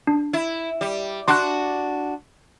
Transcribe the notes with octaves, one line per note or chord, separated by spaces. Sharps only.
D4
E4
G3
D4 F#4 C6 D6 F#6